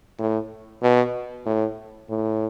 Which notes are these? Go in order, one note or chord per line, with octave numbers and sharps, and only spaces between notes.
A2
B2
A2
A2